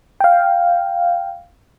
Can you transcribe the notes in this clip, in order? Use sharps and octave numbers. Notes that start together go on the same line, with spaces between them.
F5 G5